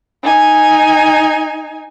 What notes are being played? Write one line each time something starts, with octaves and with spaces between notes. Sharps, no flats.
D#4 G#5